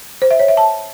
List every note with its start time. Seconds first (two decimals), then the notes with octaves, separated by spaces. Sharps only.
0.22 C5
0.31 E5
0.40 C#5
0.48 E5
0.57 A5